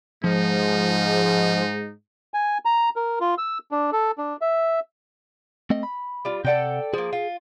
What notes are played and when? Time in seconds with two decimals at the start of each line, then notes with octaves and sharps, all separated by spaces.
0.24 G#2 F3 G#3 D#4
2.34 G#5
2.65 A#5
2.96 A#4
3.20 F4
3.38 E6
3.71 D4
3.92 A4
4.18 D4
4.42 E5
5.70 A3 C4 D#5
5.83 B5
6.25 G3 F4
6.45 C3 A4 D5 F#5 G5
6.94 F3 A#3 G#4
7.13 F4